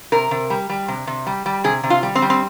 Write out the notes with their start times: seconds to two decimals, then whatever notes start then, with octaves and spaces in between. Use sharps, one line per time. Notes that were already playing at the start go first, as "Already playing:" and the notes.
0.12 C3 A#4
0.31 C3
0.50 G3
0.69 G3
0.88 C3
1.07 C3
1.26 G3
1.46 G3
1.64 C3 G#4
1.83 C3
1.90 F4
2.03 G3
2.15 C4
2.22 G3
2.30 C4